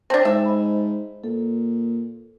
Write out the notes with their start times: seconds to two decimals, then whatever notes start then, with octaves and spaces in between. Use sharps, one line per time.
0.10 C4 D4 C5 G5 A5
0.25 G#2 E5
0.45 D#5 B5
1.24 A#2 A4